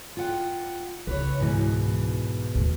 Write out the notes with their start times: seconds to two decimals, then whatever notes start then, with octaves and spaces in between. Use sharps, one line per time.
0.17 F4 F#5 G5
1.07 C#2 B4 C#5
1.40 G#2 B2 E3
2.55 D#2 A2